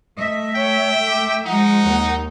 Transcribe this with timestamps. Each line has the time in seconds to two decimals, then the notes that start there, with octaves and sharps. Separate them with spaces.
0.18 A3 D#5 E5
0.55 C#5 G5
1.07 D6
1.46 F3 G#3 D#4 F#5
1.82 D#2